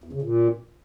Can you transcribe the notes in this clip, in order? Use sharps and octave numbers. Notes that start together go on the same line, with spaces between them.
E2
C#3
A#2